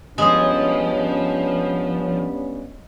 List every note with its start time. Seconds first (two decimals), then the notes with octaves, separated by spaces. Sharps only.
0.18 G2 F3 G#3 B3 C#4 G#4